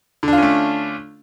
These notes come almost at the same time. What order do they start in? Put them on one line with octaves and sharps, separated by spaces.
D3 D4 F4 C#4 A3